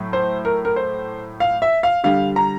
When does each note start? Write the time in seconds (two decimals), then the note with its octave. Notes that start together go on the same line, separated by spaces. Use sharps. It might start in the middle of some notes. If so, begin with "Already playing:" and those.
Already playing: A2 F#3 A3
0.13 C5
0.45 A#4
0.65 A#4
0.76 C5
1.40 F5
1.62 E5
1.83 F5
2.04 D3 G3 F5
2.36 A#5